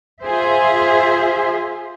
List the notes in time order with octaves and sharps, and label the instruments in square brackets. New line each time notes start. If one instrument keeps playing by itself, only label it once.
[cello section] F4 G#4 C5 E5